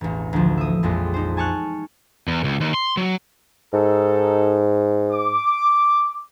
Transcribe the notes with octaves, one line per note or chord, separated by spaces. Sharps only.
E1 A1
D2 F3
E5 D#6
A#1 F2 G#3 G4
D#4 C5
G#5 A5 C#6 F6 F#6
E2
C#2
D#2
C6
F#3
G#2 D#4 A4
D6